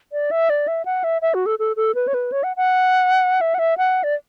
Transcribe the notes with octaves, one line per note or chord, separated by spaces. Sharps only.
D5
E5
D5
E5
F#5
E5
E5
F#4
A4
A4
A4
B4
C#5
B4
C#5
F#5
F#5
E5
F#5
E5
F#5
D5